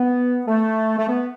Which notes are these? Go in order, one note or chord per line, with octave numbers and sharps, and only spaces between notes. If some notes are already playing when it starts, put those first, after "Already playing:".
Already playing: B3
A3
A3
B3